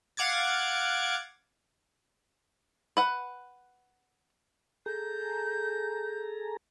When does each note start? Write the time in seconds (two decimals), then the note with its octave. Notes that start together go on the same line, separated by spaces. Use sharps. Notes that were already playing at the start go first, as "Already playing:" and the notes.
0.17 F5 F#5 D6 G#6 A6
2.97 B4 F#5
4.86 G#4 A4 A#5 G6